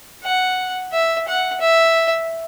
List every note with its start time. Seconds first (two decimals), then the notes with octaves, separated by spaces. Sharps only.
0.24 F#5
0.93 E5
1.27 F#5
1.61 E5